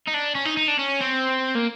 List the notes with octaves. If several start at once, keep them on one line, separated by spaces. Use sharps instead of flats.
D#4
D4
C#4
D#4
D#4
D4
C#4
C4
A#3